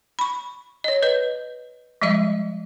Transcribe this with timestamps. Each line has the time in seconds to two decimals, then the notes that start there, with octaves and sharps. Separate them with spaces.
0.19 B5 C#6
0.84 C#5 D#5
1.03 B4 D#5
2.02 F3 G3 G#3 D#5 E5